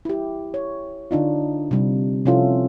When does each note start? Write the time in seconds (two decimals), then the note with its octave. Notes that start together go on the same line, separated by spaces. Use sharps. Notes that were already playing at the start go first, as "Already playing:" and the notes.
0.05 E4 G4
0.54 C#5
1.11 D3 D4 D#4 F4
1.71 C3 G3
2.26 C3 F3 C#4 E4 F4 A4